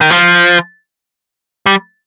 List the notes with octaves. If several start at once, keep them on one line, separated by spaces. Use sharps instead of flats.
D#3
F3
G3